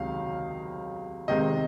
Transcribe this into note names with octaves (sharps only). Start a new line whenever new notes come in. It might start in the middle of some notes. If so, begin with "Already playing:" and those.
Already playing: C#2 C3 D#3 F#3 F5
C3 D#3 G#3 C4 D#5